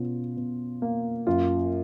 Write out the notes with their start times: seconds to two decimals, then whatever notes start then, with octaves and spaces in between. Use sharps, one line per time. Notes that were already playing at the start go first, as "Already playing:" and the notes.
Already playing: B2 C#4 F4
0.37 B2
0.82 A#3
1.27 F#2 F4